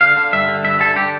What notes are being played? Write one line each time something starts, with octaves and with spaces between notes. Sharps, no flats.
D3 F5
D3
G2 E5
D3
G2 E5
D3 A4
D3 G4